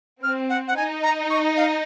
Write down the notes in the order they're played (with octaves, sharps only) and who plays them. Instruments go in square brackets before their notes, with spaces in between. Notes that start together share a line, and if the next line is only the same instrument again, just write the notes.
[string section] C4 [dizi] F6
[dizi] F#5
F#5
[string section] D#4 [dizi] G#5
[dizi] A#5
C#6
F5